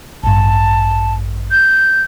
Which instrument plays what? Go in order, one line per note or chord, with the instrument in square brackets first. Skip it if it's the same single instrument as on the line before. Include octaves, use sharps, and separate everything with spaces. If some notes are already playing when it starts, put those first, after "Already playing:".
[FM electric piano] A1 G2 [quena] A5
[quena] G6